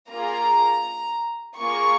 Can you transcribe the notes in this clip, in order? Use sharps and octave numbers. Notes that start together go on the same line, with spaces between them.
A#3 F4 G#4 A#5
A#3 F4 G#4 C#6